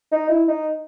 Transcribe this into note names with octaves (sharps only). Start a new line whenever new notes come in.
D#4
E4
D#4